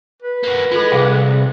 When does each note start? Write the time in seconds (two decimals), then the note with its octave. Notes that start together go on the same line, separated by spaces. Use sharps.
0.22 B4
0.43 A#3 F#4
0.72 G#3 F4 A4
0.92 C2 G#4 F5 G5